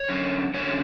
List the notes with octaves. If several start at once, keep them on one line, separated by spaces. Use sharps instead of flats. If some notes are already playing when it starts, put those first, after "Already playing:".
Already playing: C#5
D3 F#3 C#4
D3 F#3 C#4 C#5